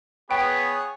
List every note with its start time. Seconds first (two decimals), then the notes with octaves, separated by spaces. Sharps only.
0.31 B3 G#4 B4 C#5 G5